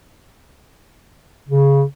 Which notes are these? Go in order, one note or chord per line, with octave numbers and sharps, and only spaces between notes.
C#3